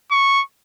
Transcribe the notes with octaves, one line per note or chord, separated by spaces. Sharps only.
C#6